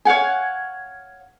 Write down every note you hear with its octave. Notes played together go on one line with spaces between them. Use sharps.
C#5 F5 F#5 G#5